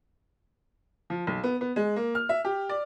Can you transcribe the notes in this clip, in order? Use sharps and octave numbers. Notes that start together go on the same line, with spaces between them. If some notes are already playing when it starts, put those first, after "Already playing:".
F3
B1
B3
B3
G#3
A#3
F6
E5
G4
D5